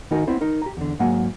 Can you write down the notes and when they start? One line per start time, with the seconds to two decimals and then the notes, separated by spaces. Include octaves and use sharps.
0.11 D#3 D#4 F#4 A#4 G#5
0.27 B3 C4 E4 C5
0.41 D#4 A#4
0.62 G4 A#5
0.77 E2 D3
0.99 G#2 F#3 A#3 F#5 G#5